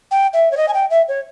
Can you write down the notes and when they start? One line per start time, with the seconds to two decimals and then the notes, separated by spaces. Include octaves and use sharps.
0.11 G5
0.33 E5
0.52 C#5
0.57 D#5
0.68 G#5
0.74 G5
0.90 E5
1.08 C#5